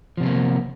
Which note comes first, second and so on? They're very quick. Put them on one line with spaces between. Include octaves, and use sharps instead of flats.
F3 C3 B3 A#3